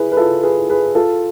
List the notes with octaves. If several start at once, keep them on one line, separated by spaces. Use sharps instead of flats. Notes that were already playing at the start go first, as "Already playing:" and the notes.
Already playing: E4 G#4 B4
B4
F4 A4
G#4 B4
G#4 B4
F4 A4